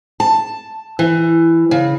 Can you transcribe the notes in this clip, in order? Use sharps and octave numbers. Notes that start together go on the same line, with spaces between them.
A5
E3
C#3